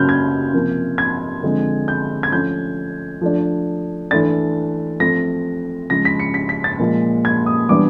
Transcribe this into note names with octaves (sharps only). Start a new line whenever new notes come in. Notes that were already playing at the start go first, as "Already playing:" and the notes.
Already playing: C#3 F#3 A#3 F6 G6
G#6
C3 F3 A#3
G#6
D3 F3 G#3 C4
G6
G#6
F3 A3 C#4 G6
F3 A3 D4
E3 A3 D4 A6
F3 A3 C4 A#6
C#3 F3 G#3 A#6
B6
C#7
B6
B6
A6
A#2 F3 G#3
G#6
D#6
E3 G3 B3 D4 D6